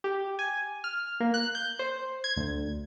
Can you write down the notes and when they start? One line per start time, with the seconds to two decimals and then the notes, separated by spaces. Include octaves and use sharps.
0.04 G4
0.39 G#5
0.84 F6
1.20 A#3
1.34 F#6
1.55 G6
1.79 C5
2.24 G#6
2.36 D2